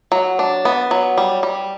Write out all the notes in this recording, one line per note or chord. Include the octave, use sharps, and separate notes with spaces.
F#3
D4
B3
F#3
G3
G3